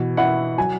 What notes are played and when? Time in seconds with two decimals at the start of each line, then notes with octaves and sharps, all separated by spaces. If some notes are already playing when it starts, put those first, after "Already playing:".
Already playing: B2 E3
0.17 E4 F#5
0.58 F#3 G#5